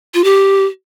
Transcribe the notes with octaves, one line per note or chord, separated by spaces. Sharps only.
F4
G4